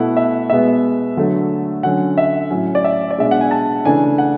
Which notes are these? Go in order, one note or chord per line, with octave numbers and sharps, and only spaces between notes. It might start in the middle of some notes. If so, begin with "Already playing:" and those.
Already playing: B2 A3 E4 F#5
E5
B2 G#3 B3 E5
D3 F#3 A3
D3 F#3 C#4 F#5
E5
A2 F#3 C#4
D5
E5
D5
B2 G#3 D4 E5
F#5
G#5
A5
C#3 E3 A3 D4 G#5
F#5